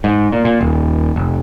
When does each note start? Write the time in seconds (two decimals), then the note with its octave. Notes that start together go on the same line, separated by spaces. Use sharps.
0.04 G#2
0.32 A#2
0.45 A#2
0.61 D#1
1.16 F1